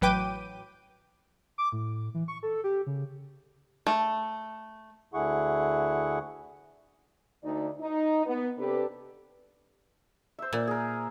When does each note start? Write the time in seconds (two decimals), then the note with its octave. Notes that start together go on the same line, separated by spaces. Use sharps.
0.01 A1 F#3 B4 G5 D6 D#7
1.58 D6
1.72 A2
2.14 E3
2.28 C#6
2.43 A4
2.64 G4
2.87 C#3
3.87 A3
5.14 D2 D3 E4 G#4 F#5 C#6
7.44 D2 D#4 D5
7.81 D#4
8.26 B3
8.59 C3 D4 G4 A4 B4
10.39 C5 E5
10.53 A#2
10.67 G#4 A#4